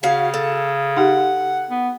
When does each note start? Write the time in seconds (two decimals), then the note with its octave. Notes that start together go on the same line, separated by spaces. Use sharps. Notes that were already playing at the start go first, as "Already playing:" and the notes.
0.03 C#3 C#4 F#4 F5
0.34 A4
0.97 D#4 G4 F#5
1.70 B3